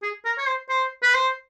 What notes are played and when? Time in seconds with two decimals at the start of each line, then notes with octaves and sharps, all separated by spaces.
0.02 G#4
0.25 A#4
0.38 C#5
0.47 C5
0.70 C5
1.03 B4
1.14 C5